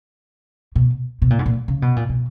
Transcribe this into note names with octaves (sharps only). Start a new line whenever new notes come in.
B2
B2
A#2
G#2
A#2
C#3
B2
A#2
B2